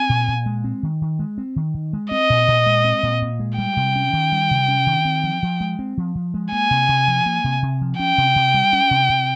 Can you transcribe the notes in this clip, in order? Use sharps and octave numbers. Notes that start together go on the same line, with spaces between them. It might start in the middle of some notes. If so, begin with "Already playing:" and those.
Already playing: C4 G#5
A#2
A#2
G#3
C4
D#3
D#3
G#3
C4
D#3
D#3
G#3
C4 D#5
A#2
A#2
G#3
C4
A#2
A#2
G#3
G3 G5
C3
C#4
D#3
G3
C3
C#4
D#3
C4
F3
F3
G#3
C4
F3
F3
G#3
A#3 G#5
C3
C3
F3
A#3
C3
C3
F3
C#4 G5
C3
C3
G3
C#4
C3
C3